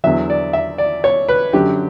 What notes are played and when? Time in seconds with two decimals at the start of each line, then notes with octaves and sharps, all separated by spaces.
0.04 E2 D3 F#3 E5
0.30 D5
0.53 E5
0.78 D5
1.04 C#5
1.28 B4
1.53 F#2 D3 F#3 G4